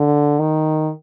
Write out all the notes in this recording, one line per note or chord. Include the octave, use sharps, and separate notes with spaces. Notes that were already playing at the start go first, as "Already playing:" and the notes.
Already playing: D3
D#3